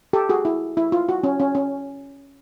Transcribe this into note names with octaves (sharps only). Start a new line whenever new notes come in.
G4 A4
F#4 G#4
E4
E4
F4
F#4
C#4
C#4
C#4